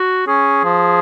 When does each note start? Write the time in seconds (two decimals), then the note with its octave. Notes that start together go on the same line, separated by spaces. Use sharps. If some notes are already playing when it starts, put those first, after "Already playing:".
Already playing: F#4
0.27 C#4 G#4
0.65 F3